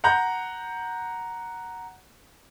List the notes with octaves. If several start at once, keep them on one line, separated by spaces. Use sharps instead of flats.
F#5 A#5 G6